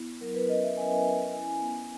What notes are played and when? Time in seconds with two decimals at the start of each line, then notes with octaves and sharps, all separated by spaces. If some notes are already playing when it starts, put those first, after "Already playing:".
Already playing: B3 E4
0.21 F#3 A#4
0.35 B4
0.49 C#4 D#5
0.63 E5
0.77 C#4 G#5
1.05 C#4
1.33 E4 G#5
1.61 B3